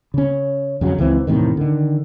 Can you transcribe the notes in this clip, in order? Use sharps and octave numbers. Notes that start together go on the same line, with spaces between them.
C#3 C#4
F2 C#3 F#3
C#2 E3 F3 C4
E2 A2 C3 D#3
D3 D#3